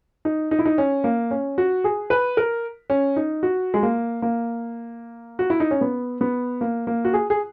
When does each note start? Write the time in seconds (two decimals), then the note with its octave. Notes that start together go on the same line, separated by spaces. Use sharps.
0.25 D#4
0.51 D#4
0.59 E4
0.65 D#4
0.78 C#4
1.04 A#3
1.31 C#4
1.58 F#4
1.84 G#4
2.10 B4
2.37 A#4
2.90 C#4
3.16 D#4
3.43 F#4
3.74 G#3
3.83 A#3
4.22 A#3
5.39 F#4
5.50 E4
5.60 D#4
5.71 C#4
5.81 B3
6.21 B3
6.61 A#3
6.87 A#3
7.05 F#4
7.14 G#4
7.30 G#4